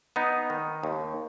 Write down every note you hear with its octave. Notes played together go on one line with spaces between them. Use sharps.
B3 D#4
D#3
D#2